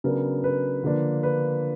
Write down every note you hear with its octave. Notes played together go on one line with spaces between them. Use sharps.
C#3 F#3 B3 D4 A#4
B4
D3 F3 A#3 D4
B4